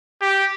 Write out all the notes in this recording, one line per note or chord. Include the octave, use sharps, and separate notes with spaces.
G4